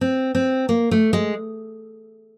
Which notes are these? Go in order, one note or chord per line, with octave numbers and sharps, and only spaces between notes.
C4
C4
A#3
A3
G#3